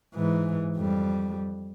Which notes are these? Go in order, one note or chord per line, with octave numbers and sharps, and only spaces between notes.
G#2 E3
F2 G3